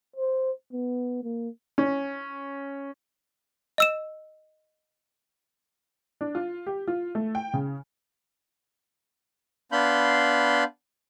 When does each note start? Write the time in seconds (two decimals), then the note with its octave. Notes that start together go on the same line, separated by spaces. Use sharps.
0.16 C5
0.73 B3
1.24 A#3
1.78 C#4
3.78 D#5 E6 E7
6.21 D4
6.35 F4
6.66 G4
6.88 F4
7.15 A3
7.35 G5
7.54 C#3
9.72 B3 D4 F5 B5 C6 G6